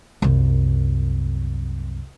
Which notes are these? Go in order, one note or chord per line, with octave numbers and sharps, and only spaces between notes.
C2 F#2